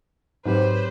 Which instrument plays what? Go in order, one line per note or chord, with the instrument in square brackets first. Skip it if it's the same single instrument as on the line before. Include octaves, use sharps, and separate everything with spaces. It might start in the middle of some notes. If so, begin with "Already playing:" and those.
[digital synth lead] G#2 [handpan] F#3 C4 G4 [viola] B4 C5